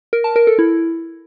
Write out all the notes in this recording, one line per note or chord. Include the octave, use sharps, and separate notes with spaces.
A#4
A5
A#4
A4
E4